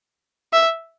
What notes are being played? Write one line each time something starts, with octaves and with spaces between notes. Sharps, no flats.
E5